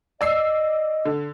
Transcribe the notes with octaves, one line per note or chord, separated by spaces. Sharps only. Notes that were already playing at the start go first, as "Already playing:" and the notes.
D5 D#5 E6 C7
D3